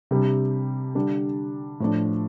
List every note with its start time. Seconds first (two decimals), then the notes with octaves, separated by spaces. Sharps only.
0.11 C3 G3 D4
0.95 D3 G3 D4
1.80 A2 F3 D4